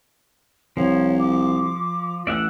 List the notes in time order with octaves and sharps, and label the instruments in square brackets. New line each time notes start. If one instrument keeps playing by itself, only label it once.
[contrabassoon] C2 [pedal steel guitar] F3 [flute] C#5
[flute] D6
[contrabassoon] A1 [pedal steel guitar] D5 E5 F#5